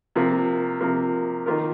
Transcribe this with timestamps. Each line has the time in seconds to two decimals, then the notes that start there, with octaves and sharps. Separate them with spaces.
0.15 C3 F3 A#3
0.81 C3 F3 A#3
1.46 D#3 A#3 F4 A#4